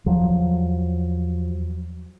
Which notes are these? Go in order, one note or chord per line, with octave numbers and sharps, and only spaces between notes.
E2 F3 F#3